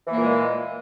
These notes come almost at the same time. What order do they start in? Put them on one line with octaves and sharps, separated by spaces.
E3 A#3 A#2 G#3